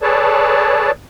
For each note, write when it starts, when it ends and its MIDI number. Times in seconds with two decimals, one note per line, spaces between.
0.02 0.91 68
0.02 0.91 69
0.02 0.91 71
0.02 0.91 73
0.02 0.91 74
0.02 0.91 81